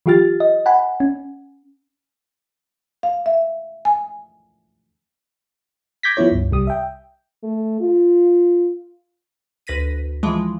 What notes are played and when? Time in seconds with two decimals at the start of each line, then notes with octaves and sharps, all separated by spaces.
0.06 E3 F#3 F4 G4 F6 A6
0.40 D#5
0.66 F#5 G#5 B5
1.00 C#4
3.03 F5
3.26 E5
3.85 G#5
6.03 D6 G6 G#6 A#6 B6
6.17 F3 B3 E4 C#5
6.32 C#2 G2
6.51 C2 G3 D#6
6.67 E5 G5
7.43 A3
7.80 F4
9.67 D2 B4 A#6 B6 D#7
10.23 E3 F3 G#3